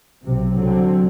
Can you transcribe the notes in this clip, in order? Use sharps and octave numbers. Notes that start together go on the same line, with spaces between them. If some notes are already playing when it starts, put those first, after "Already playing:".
B1 C3
C2 D3 F#3 C4